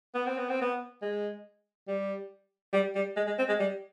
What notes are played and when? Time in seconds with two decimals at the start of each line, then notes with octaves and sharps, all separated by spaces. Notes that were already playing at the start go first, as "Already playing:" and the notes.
0.15 B3
0.26 C4
0.38 B3
0.49 C4
0.61 B3
1.02 G#3
1.88 G3
2.73 G3
2.95 G3
3.17 G#3
3.27 G#3
3.39 C4
3.48 G#3
3.60 G3